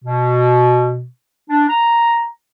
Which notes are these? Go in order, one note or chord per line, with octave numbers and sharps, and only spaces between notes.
B2
D4
A#5